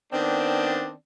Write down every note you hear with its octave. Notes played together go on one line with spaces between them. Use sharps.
D#3 B3 C4 D4